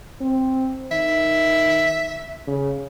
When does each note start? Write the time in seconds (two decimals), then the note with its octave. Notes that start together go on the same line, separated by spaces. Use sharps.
0.21 C4
0.92 D#3 E5
2.48 C#3